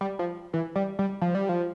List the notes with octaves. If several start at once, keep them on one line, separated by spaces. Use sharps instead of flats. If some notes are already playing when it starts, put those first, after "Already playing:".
G3
F3
E3
G3
G3
F3
G3
F3